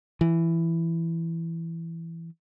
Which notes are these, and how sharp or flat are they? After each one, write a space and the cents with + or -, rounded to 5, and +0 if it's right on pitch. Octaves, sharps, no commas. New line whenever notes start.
E3 +10